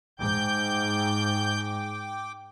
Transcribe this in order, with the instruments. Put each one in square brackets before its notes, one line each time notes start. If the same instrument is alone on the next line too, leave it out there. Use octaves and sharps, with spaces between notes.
[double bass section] G#2 [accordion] G5 D6 [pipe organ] G6